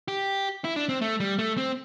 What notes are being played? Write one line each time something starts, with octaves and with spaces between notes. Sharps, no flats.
G4
E4
D4
C4
A3
G3
A3
C4